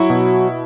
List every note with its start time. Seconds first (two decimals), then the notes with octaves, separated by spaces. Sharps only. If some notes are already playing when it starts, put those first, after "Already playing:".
Already playing: F#3 E4 F#4
0.10 B2